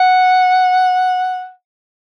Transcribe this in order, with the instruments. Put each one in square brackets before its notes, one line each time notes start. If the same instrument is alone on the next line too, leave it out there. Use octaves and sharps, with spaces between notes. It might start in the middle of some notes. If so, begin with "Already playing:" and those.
Already playing: [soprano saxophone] F#5